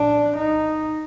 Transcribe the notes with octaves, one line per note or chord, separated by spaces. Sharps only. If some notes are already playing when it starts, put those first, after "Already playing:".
Already playing: D4
D#4